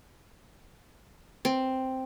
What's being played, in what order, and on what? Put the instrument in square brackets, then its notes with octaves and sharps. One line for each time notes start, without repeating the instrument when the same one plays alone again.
[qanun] C4